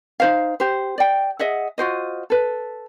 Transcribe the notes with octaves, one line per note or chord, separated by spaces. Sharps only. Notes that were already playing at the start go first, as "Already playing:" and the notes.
D#4 C5 F5
G4 C5
D5 G5
G#4 D#5 E5 F#5
F4 F#4 C5 D#5
A4 B4